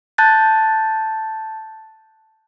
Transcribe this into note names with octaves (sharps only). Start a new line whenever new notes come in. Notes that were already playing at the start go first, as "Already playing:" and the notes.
A5 F#6 G6 A6